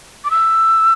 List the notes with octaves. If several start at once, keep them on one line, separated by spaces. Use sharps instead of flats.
D6
E6